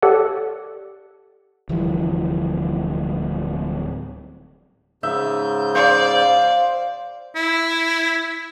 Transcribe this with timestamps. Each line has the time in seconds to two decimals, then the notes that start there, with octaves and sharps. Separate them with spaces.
0.03 G4 A4 C#5 D5 F#5
1.69 D1 E3 F3 G3
5.03 G#2 C#3 E5 G6
5.75 C5 D5 F5
7.36 E4